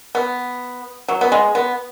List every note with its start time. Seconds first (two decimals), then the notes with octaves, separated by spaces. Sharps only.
0.15 B3
1.08 F#3
1.21 B3
1.32 G#3
1.55 B3